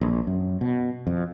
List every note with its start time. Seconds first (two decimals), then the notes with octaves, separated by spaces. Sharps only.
0.01 A#1
0.27 F#2
0.61 B2
1.07 F2